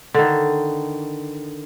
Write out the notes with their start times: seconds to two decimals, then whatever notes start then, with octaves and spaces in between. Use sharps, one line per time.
0.14 D3 D#3